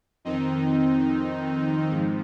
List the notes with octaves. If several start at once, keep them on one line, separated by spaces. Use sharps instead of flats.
F2 D#3 C4 D#4
G#2 F3